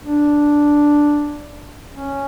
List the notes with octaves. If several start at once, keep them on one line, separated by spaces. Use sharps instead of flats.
D4
C#4